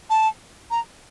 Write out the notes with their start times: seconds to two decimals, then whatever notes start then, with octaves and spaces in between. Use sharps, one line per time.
0.10 A5
0.71 A#5